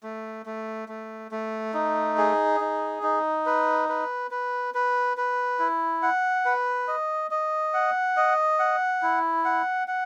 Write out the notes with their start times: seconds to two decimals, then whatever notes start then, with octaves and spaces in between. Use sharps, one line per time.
0.03 A3
0.46 A3
0.89 A3
1.31 A3
1.74 D#4
2.17 G#4
2.60 D#4
3.03 D#4
3.46 B4
3.89 B4
4.31 B4
4.74 B4
5.17 B4
5.59 E4
6.03 F#5
6.45 B4
6.88 D#5
7.31 D#5
7.74 F#5
8.17 D#5
8.59 F#5
9.03 E4
9.45 F#5
9.88 F#5